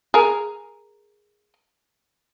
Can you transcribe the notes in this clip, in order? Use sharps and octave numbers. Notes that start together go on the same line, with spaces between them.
G#4 A#4